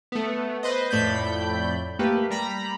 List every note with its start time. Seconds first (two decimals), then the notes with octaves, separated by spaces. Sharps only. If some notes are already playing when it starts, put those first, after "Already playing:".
0.12 A3 B3
0.63 B4 C5 D#5
0.90 F2 A2 A3 D5 B5 G6
1.99 A3 A#3 G4 B4
2.30 G3 A#5 B5